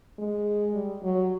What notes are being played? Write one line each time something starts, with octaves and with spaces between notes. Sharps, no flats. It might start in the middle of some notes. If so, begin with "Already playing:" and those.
G#3
G3
F#3